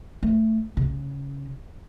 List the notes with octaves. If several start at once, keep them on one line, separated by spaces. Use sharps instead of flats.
A3
C#3